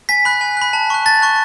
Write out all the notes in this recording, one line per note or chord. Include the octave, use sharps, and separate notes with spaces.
G#5 B6
B5 F#6
G#5
B5 F#6
A5
C#6 F#6
A5 A6
C#6 F#6